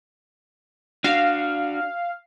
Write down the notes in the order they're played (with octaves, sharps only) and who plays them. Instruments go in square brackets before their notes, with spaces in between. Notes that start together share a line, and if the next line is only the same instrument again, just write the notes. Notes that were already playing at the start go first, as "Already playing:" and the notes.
[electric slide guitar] D4 F#4 [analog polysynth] F5